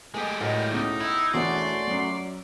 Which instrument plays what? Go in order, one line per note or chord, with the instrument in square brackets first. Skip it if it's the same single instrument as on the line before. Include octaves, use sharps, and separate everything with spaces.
[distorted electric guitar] G#3 G4 [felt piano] A3 G#4 D#5
[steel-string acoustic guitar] A2 [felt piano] F#4 D#5 [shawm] A#4
[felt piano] C#2 B2 [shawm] D#4
[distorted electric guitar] E4
[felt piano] E1 B2 E3 [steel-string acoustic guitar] A3 C#4 F#4 [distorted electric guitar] D5 [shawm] C6
[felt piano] F#2 F#3